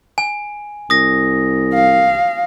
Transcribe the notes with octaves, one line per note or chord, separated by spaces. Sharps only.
G#5
C2 D#6 A#6
F5